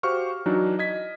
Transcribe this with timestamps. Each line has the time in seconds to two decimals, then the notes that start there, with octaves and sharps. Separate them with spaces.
0.03 F#4 G4 C5 F5 C#6 F6
0.46 E3 F#3 D4 D#4 F#4
0.79 D#5 G#6 B6